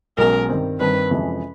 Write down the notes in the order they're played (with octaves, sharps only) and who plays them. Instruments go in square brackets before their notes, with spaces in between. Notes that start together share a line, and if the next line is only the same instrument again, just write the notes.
[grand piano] B1 B2 G#3 C#4 F#4 [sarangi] A#4
[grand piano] G2 D#3 G3 C4
[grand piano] G2 D#3 G3 C4 [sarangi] B4
[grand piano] F2 C3 E3 G#3 C#4